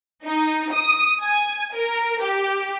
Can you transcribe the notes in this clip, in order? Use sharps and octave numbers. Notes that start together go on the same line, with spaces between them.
D#4
D#6
G#5
A#4
G4